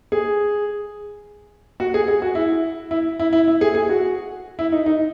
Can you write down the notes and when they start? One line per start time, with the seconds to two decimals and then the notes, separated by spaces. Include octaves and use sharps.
0.12 G#4
1.80 F#4
1.94 G#4
2.08 G#4
2.22 F#4
2.35 E4
2.91 E4
3.19 E4
3.33 E4
3.48 E4
3.61 G#4
3.75 G#4
3.89 F#4
4.59 E4
4.72 D#4
4.86 D#4